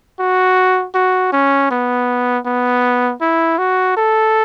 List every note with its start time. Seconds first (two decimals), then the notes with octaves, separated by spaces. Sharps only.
0.19 F#4
0.95 F#4
1.33 C#4
1.71 B3
2.46 B3
3.21 E4
3.58 F#4
3.97 A4